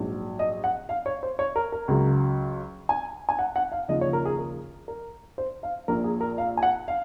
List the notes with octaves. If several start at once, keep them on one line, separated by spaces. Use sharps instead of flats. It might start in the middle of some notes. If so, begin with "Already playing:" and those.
Already playing: A#1 G#2 F#3
D#5
F#5
F5
C#5
C5
C#5
A#4
A#4
C#2 C#3 F#3
G#5
G#5
F#5
F#5
F5
D#2 C#3 F3 D#5
C#5
A#4
G#4
A#4
A#4
C5
F5
A#1 A#2 F3 A#4
G#4
A#4
F5
G#5
F#5
F5